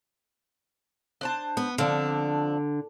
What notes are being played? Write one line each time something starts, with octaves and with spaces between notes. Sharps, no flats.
D4 C5 A5
B3
D3 F3 C4 D4